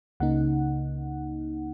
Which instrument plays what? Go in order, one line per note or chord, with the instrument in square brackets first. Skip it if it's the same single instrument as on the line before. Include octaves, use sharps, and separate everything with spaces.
[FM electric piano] C#2 C#3 A#3 D#4 F#5